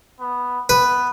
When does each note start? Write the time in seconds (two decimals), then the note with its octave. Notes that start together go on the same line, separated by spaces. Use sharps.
0.20 B3
0.69 B3 B4